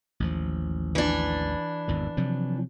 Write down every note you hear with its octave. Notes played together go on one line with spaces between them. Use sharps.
A1 D#2 F3
E3 D4
G#1 E2 D#3
C3 F3 F#3